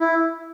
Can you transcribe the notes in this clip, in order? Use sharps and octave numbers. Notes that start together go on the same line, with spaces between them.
E4